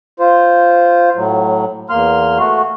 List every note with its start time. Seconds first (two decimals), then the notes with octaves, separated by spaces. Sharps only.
0.20 F4 C5
1.16 A2 F#3
1.90 E2 A#3 C6 F6
2.39 A3 F#4